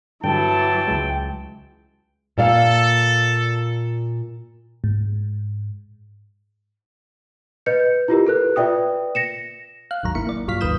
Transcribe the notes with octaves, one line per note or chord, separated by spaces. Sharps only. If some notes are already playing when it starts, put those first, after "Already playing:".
G2 D3 E3 F#3 G5 A5
C#2 G#3
A#2 A4 D5 F5
G#2
B4 D#5 G6 C#7
E4 F4 G4 A#4
A4 B4 F#6
F4 B4 D5 E5 G5 D#6
A#6 C#7 E7
F5 F#6
G#1 D#2 F#3 A#5
G#1 A#3 E4 C#7
A#3 D5
C2 G2 F#3 F4 F6 B6
G#1 D#2 B4 D#6 G6 E7